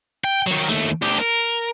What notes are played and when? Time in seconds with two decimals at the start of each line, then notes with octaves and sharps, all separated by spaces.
0.24 G5
0.47 D#3 F#3
0.69 D#2 A3
1.02 D2 G4
1.20 A#4